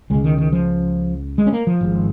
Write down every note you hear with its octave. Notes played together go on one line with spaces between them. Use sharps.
C#2 C#3 G#3
D#3
D#3
F3
G#3
C#4
A#3
F3
G#1 G#2